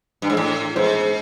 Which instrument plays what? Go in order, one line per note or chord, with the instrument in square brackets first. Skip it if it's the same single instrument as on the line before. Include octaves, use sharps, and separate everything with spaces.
[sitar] G2
G#2
A2
[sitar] G#2 [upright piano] C5